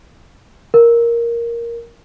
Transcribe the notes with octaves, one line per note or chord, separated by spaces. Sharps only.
A#4